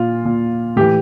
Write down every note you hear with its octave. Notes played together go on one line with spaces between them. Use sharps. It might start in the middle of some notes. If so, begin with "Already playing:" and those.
Already playing: A#2 F4
A#2
A2 E3 G4